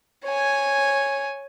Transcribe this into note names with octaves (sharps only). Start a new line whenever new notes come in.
C#5 G#5